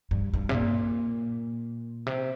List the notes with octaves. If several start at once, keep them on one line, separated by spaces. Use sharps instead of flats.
G2
G2
C3
A#2
C3